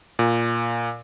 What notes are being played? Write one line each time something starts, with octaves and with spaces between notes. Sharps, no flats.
A#2